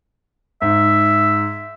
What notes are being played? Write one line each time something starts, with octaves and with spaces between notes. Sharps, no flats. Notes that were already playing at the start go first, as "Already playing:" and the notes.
G#2 E5